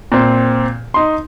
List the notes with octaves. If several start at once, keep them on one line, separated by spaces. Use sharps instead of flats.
A#2 C4
D#4 C6